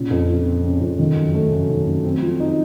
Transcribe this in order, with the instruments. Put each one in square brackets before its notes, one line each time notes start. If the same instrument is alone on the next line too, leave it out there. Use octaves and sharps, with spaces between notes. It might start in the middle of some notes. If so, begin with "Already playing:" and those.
Already playing: [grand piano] A#2 C#3
F2
F3
C4
C#3
F2
D#3
F#2
A3
F#2
D#3
F#2
C4
F3
D#4